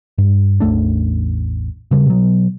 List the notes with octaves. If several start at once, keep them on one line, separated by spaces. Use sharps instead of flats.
G2
A1 E2 A3 D4
C#3 G3
B2 F#3